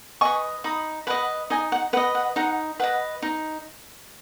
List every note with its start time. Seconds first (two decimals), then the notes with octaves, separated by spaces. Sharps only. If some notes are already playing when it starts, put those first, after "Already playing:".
0.21 B4 D#5 G#5 C#6
0.64 D#4 B5 D#6
1.07 B4 D#5 F#5 B5
1.50 D#4 D#5 G#5
1.72 F#5
1.93 B4 F#5
1.97 D#5
2.15 F#5
2.36 D#4 F#5
2.80 B4 D#5 F#5 B5
3.22 D#4